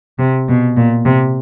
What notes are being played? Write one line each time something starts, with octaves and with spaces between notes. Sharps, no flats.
C3
B2
A#2
C3